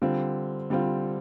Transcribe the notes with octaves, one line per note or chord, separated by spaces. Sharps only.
D3 G3 C4 F4
D3 G3 C4 F4